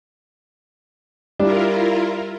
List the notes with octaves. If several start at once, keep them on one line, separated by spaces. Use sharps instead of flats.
G3 D4 E4 F4 A#4